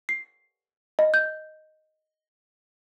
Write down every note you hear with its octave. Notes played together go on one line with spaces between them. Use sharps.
C7
D#5
G6